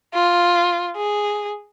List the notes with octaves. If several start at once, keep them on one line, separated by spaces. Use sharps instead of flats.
F4
G#4